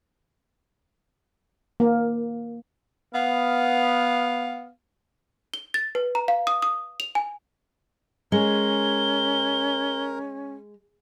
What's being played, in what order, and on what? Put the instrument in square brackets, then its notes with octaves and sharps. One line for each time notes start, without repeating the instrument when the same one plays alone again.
[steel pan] A#3
[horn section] B3 F5
[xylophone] G7
A6
B4
A#5
F5
D#6
D#6
F7
G#5
[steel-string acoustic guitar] G#3 [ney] C#4 [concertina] A#4 [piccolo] G7